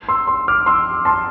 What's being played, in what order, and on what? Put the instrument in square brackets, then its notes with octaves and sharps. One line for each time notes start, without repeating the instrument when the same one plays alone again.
[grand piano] C6 E6
C6 E6
D6 F6
C6 E6
A5 C6